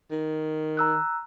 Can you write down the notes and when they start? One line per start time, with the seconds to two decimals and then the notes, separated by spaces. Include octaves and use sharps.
0.12 D#3
0.77 A#5 E6 F#6